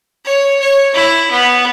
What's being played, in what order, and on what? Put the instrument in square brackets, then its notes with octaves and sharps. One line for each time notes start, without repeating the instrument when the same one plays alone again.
[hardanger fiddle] C#5
C#5
E4
B3